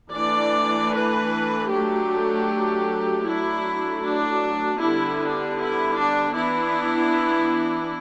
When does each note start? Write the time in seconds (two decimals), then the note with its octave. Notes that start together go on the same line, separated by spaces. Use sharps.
0.13 E3 A3 D4 D5
0.91 B4
1.68 F#3 A3 D4 G4
3.24 F#3 A3 D4 E4
4.02 D4
4.78 D3 G3 B3 D4 E4
5.18 D4
5.57 E4
5.95 D4
6.33 E3 B3 D4 E4